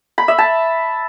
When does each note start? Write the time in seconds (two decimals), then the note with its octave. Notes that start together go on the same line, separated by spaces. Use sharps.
0.18 B5
0.28 E5
0.38 A5